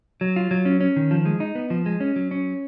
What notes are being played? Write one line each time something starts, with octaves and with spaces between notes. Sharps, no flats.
F#3
F4
F#3
C#4
C#4
D#3
F3
G#3
D#4
B3
F3
G#3
C#4
F#3
C#4